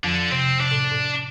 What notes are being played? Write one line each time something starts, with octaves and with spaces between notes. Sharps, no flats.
F2 D3 F3
C3 C4
C3 D4
A2
A2